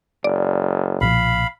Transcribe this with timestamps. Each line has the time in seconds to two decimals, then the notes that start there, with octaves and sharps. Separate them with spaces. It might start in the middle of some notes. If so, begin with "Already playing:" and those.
0.24 F#1 D5
1.01 B1 A#2 F3 F5 B5